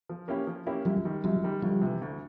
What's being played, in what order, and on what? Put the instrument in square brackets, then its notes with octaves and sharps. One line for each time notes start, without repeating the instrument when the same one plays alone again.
[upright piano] F3
A#3 C#4 E4 G4
F3
A#3 C#4 E4 G4
[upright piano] F#2 [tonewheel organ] F3 G3
[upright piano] D#3 G3
[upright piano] F#2 [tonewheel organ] F3 G3
[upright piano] D#3 G3
[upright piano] D2 [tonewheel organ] F3 G3
[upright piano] C3 E3
D2